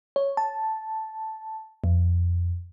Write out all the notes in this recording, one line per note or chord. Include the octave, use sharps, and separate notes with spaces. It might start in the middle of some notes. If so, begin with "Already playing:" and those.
C#5
A5
F2